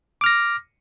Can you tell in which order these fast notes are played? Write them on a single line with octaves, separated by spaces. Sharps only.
D6 F6 A#6